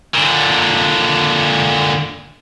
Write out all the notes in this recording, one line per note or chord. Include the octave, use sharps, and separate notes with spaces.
A#2 D3